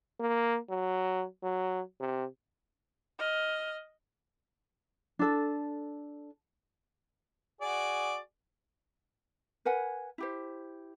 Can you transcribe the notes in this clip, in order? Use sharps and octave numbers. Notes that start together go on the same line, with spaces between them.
A#3
F#3
F#3
C3
D#5 F6
D4 A4
F#4 G#4 D5
A#4 B4 F#5 G#5
E4 G4 C5